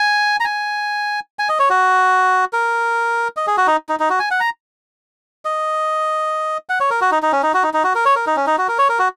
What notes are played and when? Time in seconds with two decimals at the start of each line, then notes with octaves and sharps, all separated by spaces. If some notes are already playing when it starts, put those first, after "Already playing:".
Already playing: G#5
0.40 A#5
0.45 G#5
1.39 G#5
1.49 D#5
1.59 C#5
1.70 F#4
2.53 A#4
3.37 D#5
3.47 G#4
3.58 F#4
3.67 D#4
3.89 D#4
4.00 D#4
4.10 F#4
4.20 G#5
4.31 F#5
4.40 A#5
5.45 D#5
6.69 F#5
6.80 C#5
6.90 A#4
7.01 F#4
7.11 D#4
7.22 D#4
7.32 C#4
7.43 D#4
7.54 F#4
7.63 D#4
7.74 D#4
7.84 F#4
7.95 A#4
8.06 C#5
8.16 A#4
8.27 D#4
8.36 C#4
8.47 D#4
8.58 F#4
8.68 A#4
8.79 C#5
8.89 A#4
8.99 F#4